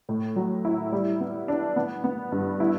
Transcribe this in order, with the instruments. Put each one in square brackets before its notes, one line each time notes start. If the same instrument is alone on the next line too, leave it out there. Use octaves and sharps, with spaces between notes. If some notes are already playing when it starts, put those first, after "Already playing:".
[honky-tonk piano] A2
F#3
E4
G3
B3
D4
B3
B3
G2
E4